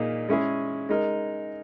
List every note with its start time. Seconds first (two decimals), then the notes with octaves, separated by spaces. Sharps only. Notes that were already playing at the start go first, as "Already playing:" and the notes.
Already playing: A#2 A#3 D#4 G#4
0.29 G#3 C#4 E4 G#4
0.89 G#3 D#4 A#4